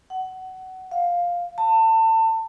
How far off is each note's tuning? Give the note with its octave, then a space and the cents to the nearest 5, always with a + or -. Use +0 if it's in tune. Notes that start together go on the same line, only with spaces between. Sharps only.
F#5 +20
F5 +5
A5 +30